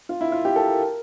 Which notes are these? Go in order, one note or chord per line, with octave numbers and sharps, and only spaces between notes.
F4
E4
F4
G4
A4
A#4